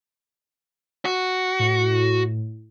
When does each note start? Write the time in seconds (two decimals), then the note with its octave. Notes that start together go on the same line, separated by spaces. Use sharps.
1.05 F#4
1.59 A2